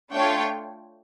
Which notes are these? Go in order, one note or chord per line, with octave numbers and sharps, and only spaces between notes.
A3 D4 F4 C#5 G5